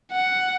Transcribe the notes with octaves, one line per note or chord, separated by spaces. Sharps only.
F#5